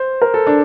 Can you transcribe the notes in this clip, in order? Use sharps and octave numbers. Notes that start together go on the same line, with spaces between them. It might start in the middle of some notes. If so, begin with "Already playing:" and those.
Already playing: C5
A#4
A4
D4